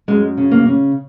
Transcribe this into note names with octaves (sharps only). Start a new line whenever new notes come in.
F#2 G#3
C#3
A#3
C#3